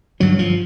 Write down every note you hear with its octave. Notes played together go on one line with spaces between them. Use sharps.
G2 D3 F#3
F3